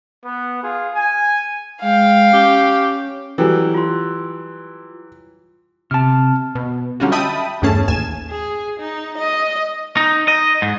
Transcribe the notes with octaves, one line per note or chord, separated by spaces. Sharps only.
B3
F4 G#4
G#5
G#3 F5 G5
C#4 G4
E3 F#3 G3 A4 G5
F4 C6
C3 A5 F6
B2
D3 F#3 G3 C#4 F4 F#4
D#5 E5 G5 A5 B5 D#6
E2 G2 A3 C#4 G#4 A5
A1 D#2 G#5 E7
G#4
D#4
D#5
D#4
D#5
G#2